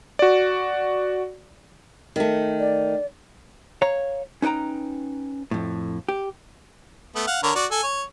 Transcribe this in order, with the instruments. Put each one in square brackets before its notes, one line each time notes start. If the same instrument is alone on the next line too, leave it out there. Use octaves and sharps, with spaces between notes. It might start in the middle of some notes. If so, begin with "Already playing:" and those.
[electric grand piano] F#4 D5
[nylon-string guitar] D#3 A3
[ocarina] D5
[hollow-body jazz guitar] C#5 F5 A#5
C#4 D#4 B4 G5 A#5
F2 A2
G4
[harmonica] A3 B3
F5 F#5
D3 A#4 C#5
F#4 D5
A4 G#5
C#5